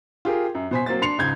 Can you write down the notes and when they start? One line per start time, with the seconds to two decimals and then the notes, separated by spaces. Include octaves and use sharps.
0.25 F4 G4 G#4 A#4
0.55 F#2
0.71 B2 C5 G#5 B6
0.86 F#3 A#3 C4 A6
1.02 D4 C6 C7 C#7 F7
1.18 C#2 G#2 G6 G#6